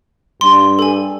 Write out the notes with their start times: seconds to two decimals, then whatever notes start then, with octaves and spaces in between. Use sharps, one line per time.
0.41 G2 C6
0.79 A4 G#5